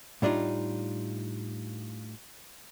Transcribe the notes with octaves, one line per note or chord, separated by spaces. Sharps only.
A2 G3 D4 D#4 F4